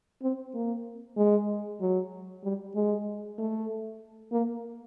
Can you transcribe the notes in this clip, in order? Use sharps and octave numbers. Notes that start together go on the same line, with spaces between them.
C4
A#3
G#3
F#3
G3
G#3
A3
A#3